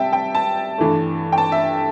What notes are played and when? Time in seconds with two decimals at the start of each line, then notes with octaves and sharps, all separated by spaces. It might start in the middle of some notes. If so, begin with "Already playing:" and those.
Already playing: C3 G3 E5 G5 A5
0.13 G5
0.35 A5
0.78 G2 E3 A3
1.32 G5
1.38 A5
1.52 E5